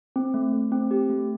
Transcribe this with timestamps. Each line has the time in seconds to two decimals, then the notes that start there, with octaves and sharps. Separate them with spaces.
0.16 C4
0.34 A3
0.53 A3
0.72 C4
0.91 G4
1.10 A3